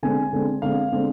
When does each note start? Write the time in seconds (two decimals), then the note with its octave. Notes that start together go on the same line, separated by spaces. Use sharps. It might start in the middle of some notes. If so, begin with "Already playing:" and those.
0.03 D3 G#3 C4 G#5
0.33 D3 G#3 C4
0.62 D3 G#3 C4 F5
0.92 D3 G#3 C4